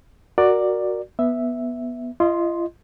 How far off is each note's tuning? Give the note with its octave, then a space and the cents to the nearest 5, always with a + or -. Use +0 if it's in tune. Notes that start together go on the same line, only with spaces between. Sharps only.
F#4 +0 A#4 +0 D5 +10
B3 -10 E5 +0
F4 -40 D#5 +0 C6 +0